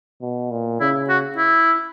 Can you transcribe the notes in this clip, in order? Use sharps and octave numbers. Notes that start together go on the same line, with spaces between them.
B2
A#2
C#3 E4
F#4
E4